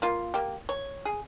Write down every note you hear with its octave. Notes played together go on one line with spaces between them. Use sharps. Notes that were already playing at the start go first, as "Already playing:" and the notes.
A#3 F4
A#3 G4
C#5
G#4